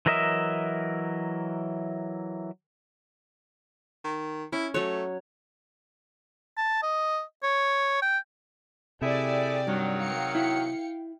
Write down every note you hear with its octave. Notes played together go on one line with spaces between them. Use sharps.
E3 F#3 A#4 D#5 E5
D#3
C#4 E4
F#3 A3 C#5
A5
D#5
C#5
G5
C3 A3 E4 G4 G#4 D5
G2 D#3 F#3
F5 G5 C#7
E4